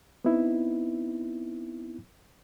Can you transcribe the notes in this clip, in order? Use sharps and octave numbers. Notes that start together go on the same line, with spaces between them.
B3 C4 D#4 E4